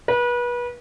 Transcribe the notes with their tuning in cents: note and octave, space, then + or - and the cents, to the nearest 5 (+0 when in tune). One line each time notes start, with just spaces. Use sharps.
B4 -30